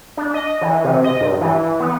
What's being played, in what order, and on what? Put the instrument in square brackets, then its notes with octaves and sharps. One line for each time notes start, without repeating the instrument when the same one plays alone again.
[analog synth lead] D4
D#5
E3
C3
D#5
G2
E3
B3